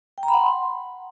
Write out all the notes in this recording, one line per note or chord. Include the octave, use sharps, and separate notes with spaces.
G5
A#5
B5
F#5
C6